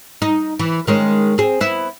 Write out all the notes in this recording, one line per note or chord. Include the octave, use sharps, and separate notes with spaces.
D#4
E3
D#3 G#3 C#4
C4 G#4
B3 E4